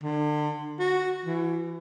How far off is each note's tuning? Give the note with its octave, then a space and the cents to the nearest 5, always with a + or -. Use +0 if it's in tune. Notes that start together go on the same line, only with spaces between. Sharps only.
D3 +35
F#4 -5
E3 +25